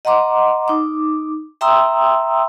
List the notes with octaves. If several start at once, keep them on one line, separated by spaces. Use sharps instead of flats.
D#5 F#5 A#5 C6 D6
D#4 D6
E5 G5 A#5 C6 D#6 E6